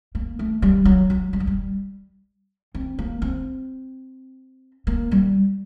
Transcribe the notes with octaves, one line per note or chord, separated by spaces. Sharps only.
A#3
A3
G3
F#3
F#3
G3
F#3
G3
C4
A#3
C4
A#3
G3